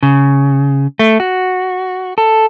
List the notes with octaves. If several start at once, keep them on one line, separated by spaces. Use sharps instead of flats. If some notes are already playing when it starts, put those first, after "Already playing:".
C#3
A3
F#4
A4